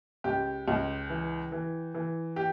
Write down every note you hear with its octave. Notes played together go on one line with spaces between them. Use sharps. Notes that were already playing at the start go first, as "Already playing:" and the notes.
C#2 G4
C#2
E3
E3
E3
G4